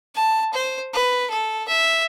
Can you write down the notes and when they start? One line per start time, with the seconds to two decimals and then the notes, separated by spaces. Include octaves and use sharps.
0.15 A5
0.53 C5
0.93 B4
1.30 A4
1.68 E5